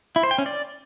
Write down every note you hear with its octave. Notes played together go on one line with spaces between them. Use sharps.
E4
C5
G5
C#4
D5